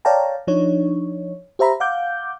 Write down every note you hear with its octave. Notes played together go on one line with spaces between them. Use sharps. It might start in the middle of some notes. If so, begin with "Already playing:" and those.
C#5 D5 F5 G5 A5 A#5
F3 D4 D#4 C#5
G4 C5 E5 A#5 B5
F5 F#5 D6 G6